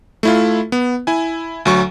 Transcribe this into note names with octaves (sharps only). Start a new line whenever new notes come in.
A3 E4 F4
B3
E4 G#5
D2 F#3 C#6